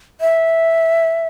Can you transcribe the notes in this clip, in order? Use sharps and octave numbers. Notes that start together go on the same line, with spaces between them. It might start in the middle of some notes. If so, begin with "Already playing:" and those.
E5